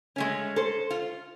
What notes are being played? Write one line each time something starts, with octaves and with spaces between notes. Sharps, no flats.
G#3 A3 C#4
A4 C5
F4